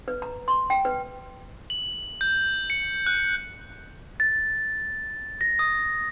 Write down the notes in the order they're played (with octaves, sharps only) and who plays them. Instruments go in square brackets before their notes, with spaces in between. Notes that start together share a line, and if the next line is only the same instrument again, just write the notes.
[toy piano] B4
A#5
C6
G5
B4
[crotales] F#7
G6
C#7
F#6
[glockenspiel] A6
A#6
D#6